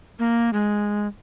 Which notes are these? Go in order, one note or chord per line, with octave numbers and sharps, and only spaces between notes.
A#3
G#3